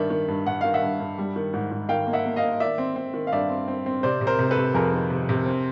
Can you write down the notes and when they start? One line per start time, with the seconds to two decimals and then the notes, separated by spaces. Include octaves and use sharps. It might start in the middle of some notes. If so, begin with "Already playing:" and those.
Already playing: G2 D#3 D5 E5
0.10 D#3
0.28 G2
0.46 G2 F#5
0.61 D#3 F5
0.74 E5 F#5
0.82 G2
1.00 G2
1.18 G3
1.36 D#3
1.53 G#2
1.72 G#2
1.89 D#3 F5 G5
2.07 A#3
2.13 E5 F#5
2.26 A#3
2.36 D#5 F5
2.43 A#3
2.60 D#3 D5 E5
2.78 C4
2.96 C4
3.14 D#3
3.27 F5
3.32 G2 D5 E5
3.50 C4
3.68 C4
3.86 C4
4.03 C3 C5 D5
4.21 C3
4.27 A#4 C5
4.39 C3
4.51 A4 B4
4.57 C3
4.74 F2 G#4 A#4
4.93 D#3
5.10 C3
5.29 C3
5.46 C4